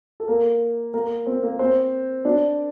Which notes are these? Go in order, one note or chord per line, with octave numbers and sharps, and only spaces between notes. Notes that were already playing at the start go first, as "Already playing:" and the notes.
A4
A#3 A#4
A#3 A#4
C4 C5
A#3 A#4
C4 C5
D4 D5